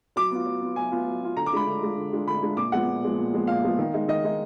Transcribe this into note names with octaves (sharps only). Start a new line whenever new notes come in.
F#3 D6
B3 F4
F#3
B3 F4
F#3 G#5
B3 F4
F#3
B3 F4
D3 A#5
D6
G#3 D4 F4 B5
D3
G#3 D4 F4
D3
G#3 D4 F4
D3 B5
G#3 D4 F4
A#2 D6
F3 G#3 B3 F#5
A#2
F3 G#3 B3
A#2
F3 G#3 B3
A#2 F5
F3 G#3 B3
D#3
G#3 D#4
D#3 D#5
G#3 D#4